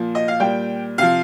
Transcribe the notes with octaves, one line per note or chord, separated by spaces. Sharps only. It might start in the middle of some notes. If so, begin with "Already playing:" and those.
Already playing: A#2 F3
D#5
F5
A#2 G3 G5
C3 F3 F5